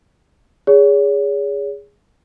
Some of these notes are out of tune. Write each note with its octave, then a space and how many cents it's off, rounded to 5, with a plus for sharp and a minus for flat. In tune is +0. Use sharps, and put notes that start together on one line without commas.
G#4 -15 C#5 +40